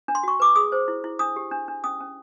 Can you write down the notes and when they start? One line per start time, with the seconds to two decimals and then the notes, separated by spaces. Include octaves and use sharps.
0.08 D4
0.15 C6
0.23 F#4 C#6
0.40 B4 D6
0.56 G#4 D#6
0.72 C5
0.88 E4
1.04 E4
1.19 D4 D#6
1.36 G4
1.52 D4
1.68 D4
1.84 C#4 D#6
2.00 C#4